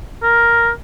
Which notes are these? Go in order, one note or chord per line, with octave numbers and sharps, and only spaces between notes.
A#4